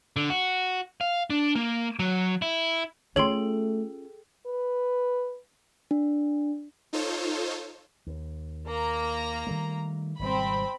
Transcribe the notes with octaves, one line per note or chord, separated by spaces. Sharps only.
D3
F#4
F5
D4
A#3
F#3
E4
A3 C#4 F4 G#4 A4 C#5 G5 C6
B4
D4
D#4 F4 A4 C5 C#5
D#2
A#3 A#5
D#3 G3 A3
G#1 B2 G3 C4 B5